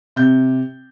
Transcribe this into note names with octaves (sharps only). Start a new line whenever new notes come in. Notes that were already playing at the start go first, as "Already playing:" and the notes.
C3 G6